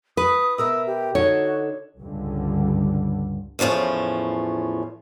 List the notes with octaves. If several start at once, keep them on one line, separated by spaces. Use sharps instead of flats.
B4 D#6
B2 A#4 E5 E6
G4
D3 D#4 F#4 A4 C#5
C#2 G2 D3
E2 A2 F3 A3 C#4